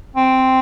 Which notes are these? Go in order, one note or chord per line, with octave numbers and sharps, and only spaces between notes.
C4